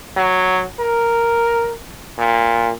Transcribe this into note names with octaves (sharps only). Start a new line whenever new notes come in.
F#3
A#4
A#2